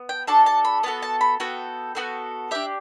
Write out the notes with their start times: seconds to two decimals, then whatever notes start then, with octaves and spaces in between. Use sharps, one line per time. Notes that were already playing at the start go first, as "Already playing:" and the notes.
Already playing: B3
0.09 G5
0.27 D4 F#4 A4 A5
0.46 A5
0.65 B5
0.83 B3 F#4 A4 A5
1.02 A5
1.21 B5
1.40 B3 F#4 A4 G5
1.95 B3 F#4 A4
2.51 D4 G4 E5